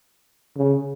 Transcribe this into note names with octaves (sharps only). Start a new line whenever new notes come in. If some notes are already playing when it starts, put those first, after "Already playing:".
C#3